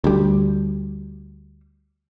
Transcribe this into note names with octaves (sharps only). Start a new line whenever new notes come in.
D2 G3